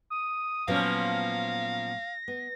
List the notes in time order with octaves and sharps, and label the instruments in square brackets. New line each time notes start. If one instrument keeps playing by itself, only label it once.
[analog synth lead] D#6
[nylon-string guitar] A#2 F#3 B3 [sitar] F3 A#3 C#4 [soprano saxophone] F5 [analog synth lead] A#6
[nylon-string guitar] B3